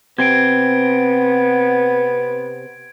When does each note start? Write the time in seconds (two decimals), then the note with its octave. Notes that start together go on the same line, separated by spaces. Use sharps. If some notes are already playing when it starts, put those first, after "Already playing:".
0.18 C3 B3 C4 G#6 D7